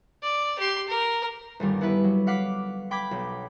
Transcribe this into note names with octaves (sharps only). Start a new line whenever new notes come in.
D5
G4 C6
A#4
G1 D#2 G3
B3 E4 B4
F#3
F5 F#5 D6 B6 C7
G5 B5 D6 G#6 B6
B1